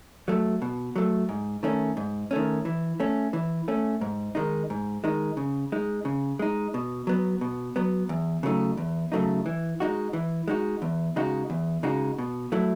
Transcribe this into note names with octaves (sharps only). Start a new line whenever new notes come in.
F#3 A3
B2
F#3 A3
G#2
D#3 A3 C#4
G#2
D#3 A3 C#4
E3
A3 C#4
E3
A3 C#4
G#2
D#3 G#3 D#4
G#2
D#3 G#3 D#4
C#3
G#3 D#4
C#3
G#3 D#4
B2
F#3 B3
B2
F#3 B3
E2
C#3 F#3 A3 D#4
E2
C#3 F#3 A3 D#4
E3
G#3 D#4 F#4
E3
G#3 D#4 F#4
E2
C#3 G#3 D#4 F#4
E2
C#3 G#3 D#4 F#4
B2
F#3 A3 E4